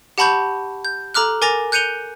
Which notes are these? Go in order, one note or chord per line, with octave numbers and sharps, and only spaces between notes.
G4 F#5 A5 B5 C#6 G6
G6
A4 A#5 D6 F6 F#6
A#4 G#5 D6 A6 A#6 F7
F#6 G6 C#7 D#7 F7 G7